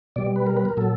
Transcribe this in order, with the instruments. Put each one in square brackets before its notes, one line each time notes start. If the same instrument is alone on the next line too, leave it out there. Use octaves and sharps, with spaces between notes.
[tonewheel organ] B2 G3 D5
B4
A#4
B4
A#4
A#2 F#3 A4